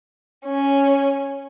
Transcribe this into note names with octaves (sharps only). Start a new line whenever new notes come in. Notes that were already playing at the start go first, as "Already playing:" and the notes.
C#4